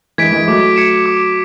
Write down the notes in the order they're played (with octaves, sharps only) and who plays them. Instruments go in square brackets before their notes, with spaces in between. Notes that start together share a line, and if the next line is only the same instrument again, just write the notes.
[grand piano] E3 G#3 [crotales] G#6 B6 D7
[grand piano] E3 G#3
[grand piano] F#3 A3 [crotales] D6
[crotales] G#6 C#7 E7
D6